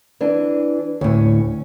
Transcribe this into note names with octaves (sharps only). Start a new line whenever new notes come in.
E3 D4
D2 A2 C#4